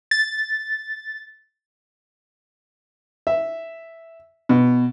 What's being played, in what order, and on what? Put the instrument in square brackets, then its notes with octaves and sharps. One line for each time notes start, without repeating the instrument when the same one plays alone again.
[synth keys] A6
[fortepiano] E5
B2